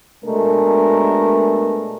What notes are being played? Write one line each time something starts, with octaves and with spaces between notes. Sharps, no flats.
B2 G#3 A3 D4 A#4